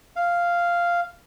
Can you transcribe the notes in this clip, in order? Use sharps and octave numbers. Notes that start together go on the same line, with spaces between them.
F5